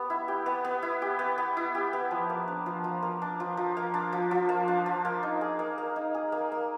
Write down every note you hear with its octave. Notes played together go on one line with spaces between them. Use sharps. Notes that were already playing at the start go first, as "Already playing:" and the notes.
Already playing: B3 G4
E4
G4
B3
B3
E4
G4
B3
B3
E4
G4
B3
F3
A#3
D4
F3
F3
A#3
D4
F3
F3
A#3
D4
F3
F3
A#3
D4
F3
A#3
D#4
G#4
A#3
A#3
D#4
G#4
A#3
A#3